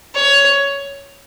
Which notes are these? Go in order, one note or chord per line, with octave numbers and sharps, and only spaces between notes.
C#5